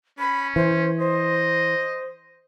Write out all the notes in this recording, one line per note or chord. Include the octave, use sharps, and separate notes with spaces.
C#4 B5
E3 C5
C5 D#5